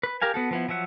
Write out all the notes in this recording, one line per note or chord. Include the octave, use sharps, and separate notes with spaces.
B4
G4 A#4 F5 G#5
B3 F#4 A4
F3 B3 E4
F3 F#3 E5 F#5